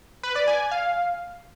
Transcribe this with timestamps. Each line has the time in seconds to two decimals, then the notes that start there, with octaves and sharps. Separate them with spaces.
0.23 B4
0.35 D5
0.47 G#5
0.59 G#5
0.71 F5